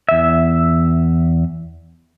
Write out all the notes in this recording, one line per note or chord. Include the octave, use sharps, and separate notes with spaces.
E2 E5